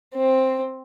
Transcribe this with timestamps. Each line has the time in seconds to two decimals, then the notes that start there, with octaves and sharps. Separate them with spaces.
0.15 C4